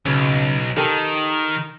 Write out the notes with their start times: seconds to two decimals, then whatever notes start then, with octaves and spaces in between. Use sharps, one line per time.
0.06 B1 C#3
0.77 D#3 G4 A4 A#4